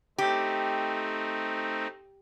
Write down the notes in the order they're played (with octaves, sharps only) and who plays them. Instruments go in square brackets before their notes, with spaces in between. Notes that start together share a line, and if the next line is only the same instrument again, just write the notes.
[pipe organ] A3 C4 D#4 [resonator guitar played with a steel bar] G4